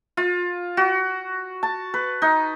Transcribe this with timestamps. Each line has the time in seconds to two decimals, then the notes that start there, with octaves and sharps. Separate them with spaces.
0.17 F4
0.77 F#4
1.63 A5
1.94 B4
2.22 D#4